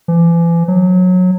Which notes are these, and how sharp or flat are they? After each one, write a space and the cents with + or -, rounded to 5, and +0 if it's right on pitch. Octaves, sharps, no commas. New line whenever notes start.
E3 +40
F#3 -20